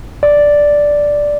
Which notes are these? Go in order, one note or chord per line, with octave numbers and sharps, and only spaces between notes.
D5